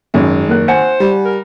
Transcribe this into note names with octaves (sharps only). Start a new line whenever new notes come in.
G#1 F#2 G#3
F#1 A#4 F#6
C5 F#5 G#5 C#7
G3
A#4